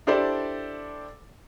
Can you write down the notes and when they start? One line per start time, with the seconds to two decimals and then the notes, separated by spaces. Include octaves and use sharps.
0.07 D4 E4 G4 A4 C5 D5